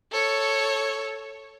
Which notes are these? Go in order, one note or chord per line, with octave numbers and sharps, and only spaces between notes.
A4 C#5